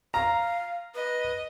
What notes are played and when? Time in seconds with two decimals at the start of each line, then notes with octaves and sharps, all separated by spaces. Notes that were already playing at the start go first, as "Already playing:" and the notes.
0.14 F5 A#5
0.95 B4 D#5